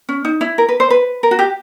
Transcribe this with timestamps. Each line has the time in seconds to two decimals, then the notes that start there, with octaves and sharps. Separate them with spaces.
0.09 C#4
0.25 D#4
0.41 E4
0.58 A#4
0.69 B4
0.80 C5
0.90 B4
1.23 A#4
1.31 F#4
1.39 G4